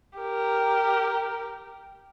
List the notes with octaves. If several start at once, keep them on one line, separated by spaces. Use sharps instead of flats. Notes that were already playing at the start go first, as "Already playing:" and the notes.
G4 A#4